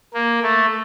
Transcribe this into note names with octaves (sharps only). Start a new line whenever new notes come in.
A#3
A3